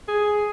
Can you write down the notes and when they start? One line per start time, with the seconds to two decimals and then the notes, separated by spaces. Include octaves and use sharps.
0.08 G#4